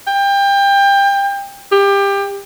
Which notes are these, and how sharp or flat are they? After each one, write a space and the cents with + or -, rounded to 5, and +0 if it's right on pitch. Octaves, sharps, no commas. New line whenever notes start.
G5 +25
G4 +25